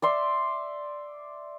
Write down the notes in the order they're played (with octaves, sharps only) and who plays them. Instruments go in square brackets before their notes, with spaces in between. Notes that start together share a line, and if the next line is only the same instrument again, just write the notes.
[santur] D5 E5 C6